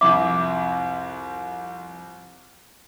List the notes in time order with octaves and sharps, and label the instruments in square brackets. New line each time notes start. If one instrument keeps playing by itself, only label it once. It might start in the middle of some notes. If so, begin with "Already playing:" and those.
[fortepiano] C2 F2 E5 [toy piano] D6